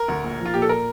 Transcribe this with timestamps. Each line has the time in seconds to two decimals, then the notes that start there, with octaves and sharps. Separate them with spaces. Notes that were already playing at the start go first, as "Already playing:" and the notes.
Already playing: A#4
0.08 D2
0.24 A#1
0.40 F3
0.46 F4
0.54 A#2 G4
0.62 A4
0.69 A#4